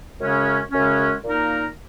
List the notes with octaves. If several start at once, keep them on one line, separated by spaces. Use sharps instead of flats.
F#2 C#3 G#3 C#4
F#2 C#3 G#3 C#4
A#2 A#3 D#4 A#4